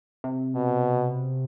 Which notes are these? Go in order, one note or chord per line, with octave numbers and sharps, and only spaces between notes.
C3
B2